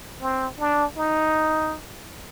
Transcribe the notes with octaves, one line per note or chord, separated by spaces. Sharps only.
C4
D4
D#4